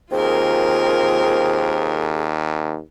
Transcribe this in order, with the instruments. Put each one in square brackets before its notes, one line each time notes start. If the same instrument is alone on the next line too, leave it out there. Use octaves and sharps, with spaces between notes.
[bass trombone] D#2 [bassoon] C4 [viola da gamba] F4 A#4 [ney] G#4